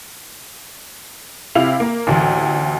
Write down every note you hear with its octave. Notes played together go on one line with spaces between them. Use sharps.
C3 E4 F5 F7
A#3 A#4
A1 D2